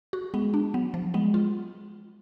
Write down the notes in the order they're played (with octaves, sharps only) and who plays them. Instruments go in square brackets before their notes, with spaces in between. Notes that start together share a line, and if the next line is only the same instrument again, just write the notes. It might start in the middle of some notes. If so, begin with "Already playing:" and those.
[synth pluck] F#4
[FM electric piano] G#3 [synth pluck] B3
[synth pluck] D4
[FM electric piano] F#3 [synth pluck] B3
[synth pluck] F3
[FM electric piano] G#3 [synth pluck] B3
[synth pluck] F4